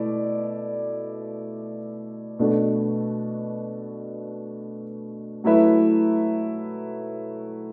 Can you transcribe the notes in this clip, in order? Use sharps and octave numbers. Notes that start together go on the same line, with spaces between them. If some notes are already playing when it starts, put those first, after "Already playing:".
Already playing: B2 A3 E4 D5
B2 A3 D4 F#4 A4
F#3 A3 E4 B4 E5